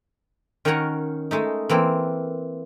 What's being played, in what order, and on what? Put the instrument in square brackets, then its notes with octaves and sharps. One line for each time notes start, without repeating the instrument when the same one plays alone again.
[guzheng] D#3 C#4 A#4 C#5 F#5 A#5
G#3 A3 D#4
E3 A#3 C4